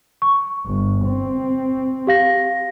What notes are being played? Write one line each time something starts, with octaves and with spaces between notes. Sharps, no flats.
C#6
G1
C4
G4 F5 A#6